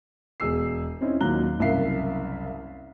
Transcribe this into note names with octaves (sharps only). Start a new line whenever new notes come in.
E1 G#4 E6 C7
C4 C#4 D#4 E4
D#2 A#2 F#3 A#5 F#6 G7
F#1 C2 A#4 E5 F5 C7